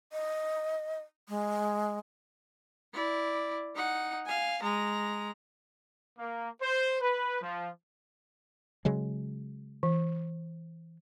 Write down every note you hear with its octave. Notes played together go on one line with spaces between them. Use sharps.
D#5
G#3
E4 D5
D#4 F#5
F5 G#5
G#3 A#5
A#3
C5
B4
F3
C#3 F#3 G#3
E3